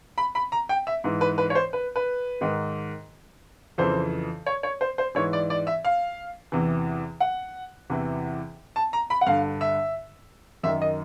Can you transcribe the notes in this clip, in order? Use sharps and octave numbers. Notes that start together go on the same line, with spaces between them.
B5
B5
A#5
G5
E5
G#2 E3
B4
B4
C#5
C5
B4
B4
G#2 D#3
F2 C#3 E3 C5
C#5
C#5
C5
C5
G#2 E3 C#5
D5
D5
E5
F5
E2 C3 E3
F#5
E2 C3 E3
A5
A#5
B5
F#5
G2 D3 F5
E5
F#2 D#3 E5
D#5